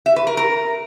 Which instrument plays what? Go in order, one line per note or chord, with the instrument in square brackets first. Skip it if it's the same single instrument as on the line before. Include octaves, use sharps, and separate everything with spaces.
[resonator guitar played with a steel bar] E5
B4
A#4
A#4